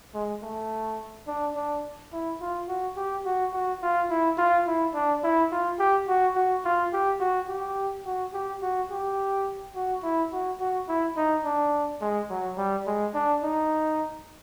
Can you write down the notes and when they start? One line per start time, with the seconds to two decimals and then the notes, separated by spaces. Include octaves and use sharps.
0.14 G#3
0.42 A3
1.27 D4
1.56 D4
2.12 E4
2.41 F4
2.68 F#4
2.97 G4
3.25 F#4
3.53 F#4
3.82 F4
4.10 E4
4.38 F4
4.67 E4
4.94 D4
5.24 E4
5.52 F4
5.79 G4
6.07 F#4
6.35 F#4
6.65 F4
6.93 G4
7.20 F#4
7.49 G4
8.05 F#4
8.33 G4
8.62 F#4
8.90 G4
9.75 F#4
10.03 E4
10.32 F#4
10.60 F#4
10.88 E4
11.17 D#4
11.45 D4
12.01 G#3
12.30 F#3
12.57 G3
12.87 G#3
13.14 D4
13.43 D#4